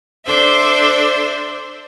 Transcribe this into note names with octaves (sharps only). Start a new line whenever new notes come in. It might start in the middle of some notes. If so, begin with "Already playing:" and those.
D4 A4 C5 E5